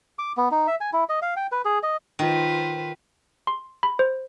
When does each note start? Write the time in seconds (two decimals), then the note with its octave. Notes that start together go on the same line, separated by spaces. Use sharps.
0.19 D6
0.37 B3
0.51 D#4
0.67 E5
0.81 G#5
0.93 E4
1.09 D#5
1.22 F5
1.36 G5
1.52 B4
1.65 G#4
1.83 D#5
2.19 D#3 F4 B4 C5
3.47 C6
3.83 B5
3.99 C5